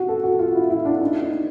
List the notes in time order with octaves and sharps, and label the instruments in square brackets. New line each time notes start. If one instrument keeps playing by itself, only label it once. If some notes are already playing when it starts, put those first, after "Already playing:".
Already playing: [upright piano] F#4
A4
F#4
F4
E4
E4
D4
D#4
D#4